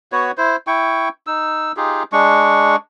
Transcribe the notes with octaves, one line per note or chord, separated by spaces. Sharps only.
B3 F#4 B4 C#5
E4 C5
E4 G5 C#6
D#4 E6
D#4 F4 G4 G#4
G#3 D4 C#6